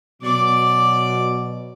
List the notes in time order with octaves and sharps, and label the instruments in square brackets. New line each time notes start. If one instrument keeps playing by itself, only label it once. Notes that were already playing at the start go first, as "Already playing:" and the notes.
[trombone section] B2 F#3 [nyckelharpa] D5 D6